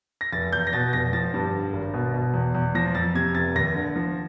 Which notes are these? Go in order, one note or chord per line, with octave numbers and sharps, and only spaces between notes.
A#6
F1 A6
E2 G6
A#6
B2 A6
F1 A#6
F3 A6
G2
D3
G#1
B2
B2
E2
E2
F3 A#6
F2 A6
C3 G#6
F1 A6
D#2 A#6
D3
F3